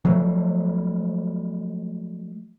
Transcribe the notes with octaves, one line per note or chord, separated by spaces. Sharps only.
F3 F#3 G#3 A3